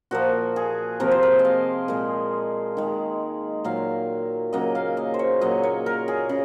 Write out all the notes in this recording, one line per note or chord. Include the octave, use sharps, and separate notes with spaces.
A#2 F3 A#3 F#4
G#4
C3 F3 A#3 A#4
C5
A#4
D#5
F5
A#2 G#3
D#3 G#3
A#2 F#3 A#3 F5
C#3 F#3 A#3 D#5
F5
D#5
C5
C#5
A#2 F#3 A#3 D#5
C#5
A#4
G#4
C#3